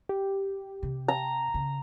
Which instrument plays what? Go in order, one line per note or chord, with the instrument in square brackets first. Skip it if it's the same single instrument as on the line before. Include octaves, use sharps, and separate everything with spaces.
[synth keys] G4
[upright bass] C3
[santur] A#5
[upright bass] C#3